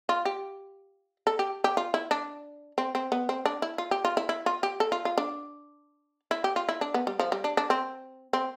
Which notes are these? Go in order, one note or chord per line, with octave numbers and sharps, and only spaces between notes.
F4
G4
A4
G4
G4
F4
E4
D4
C4
C4
B3
C4
D4
E4
F4
G4
F4
E4
E4
F4
G4
A4
F4
F4
D4
E4
G4
F4
E4
D4
B3
G3
F3
G3
D4
D4
C4
C4